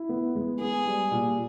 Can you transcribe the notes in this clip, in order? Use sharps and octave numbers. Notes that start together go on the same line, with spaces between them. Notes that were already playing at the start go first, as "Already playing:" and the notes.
Already playing: E4
B3
G#3
B3 G#4
G3
A#2